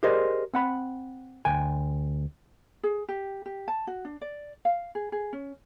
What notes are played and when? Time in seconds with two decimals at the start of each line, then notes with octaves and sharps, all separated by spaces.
0.03 G4 G#4 A#4 C5 D5 D#5
0.54 C4 F#5 B5
1.45 D2 G5 G#5
2.83 G#4
3.09 G4
3.46 G4
3.68 A5
3.87 F#4
4.05 D4
4.21 D5
4.65 F5
4.95 G#4
5.12 G#4
5.33 C#4